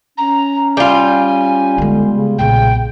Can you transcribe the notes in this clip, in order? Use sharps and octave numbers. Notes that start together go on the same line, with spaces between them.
C#4 A#5
G3 F4 G#5
D3 G#3 B3
C#3
B1 A#2 C#3 G5